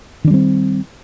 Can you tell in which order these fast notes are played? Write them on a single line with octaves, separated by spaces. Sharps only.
D#3 D4 G3 C4